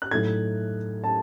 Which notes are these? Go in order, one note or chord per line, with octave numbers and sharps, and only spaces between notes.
F#6
A2 F#3 A3 D#4 G#6
A5